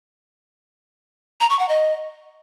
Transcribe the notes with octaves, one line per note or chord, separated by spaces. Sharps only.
A#5
C#6
F#5
D#5